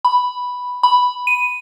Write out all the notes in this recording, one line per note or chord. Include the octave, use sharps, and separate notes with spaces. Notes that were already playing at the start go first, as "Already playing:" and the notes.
B5
B5
D#7